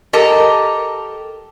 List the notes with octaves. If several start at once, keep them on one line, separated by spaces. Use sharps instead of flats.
G4 A4 A#4 D#5 A5